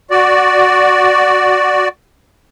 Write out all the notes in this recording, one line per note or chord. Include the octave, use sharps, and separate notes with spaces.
F#4 D5